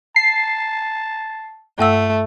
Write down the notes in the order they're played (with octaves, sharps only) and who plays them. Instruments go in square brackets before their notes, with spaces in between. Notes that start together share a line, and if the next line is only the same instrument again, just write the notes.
[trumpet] A5 [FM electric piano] C7
[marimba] G2 F#5 E6 [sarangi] A3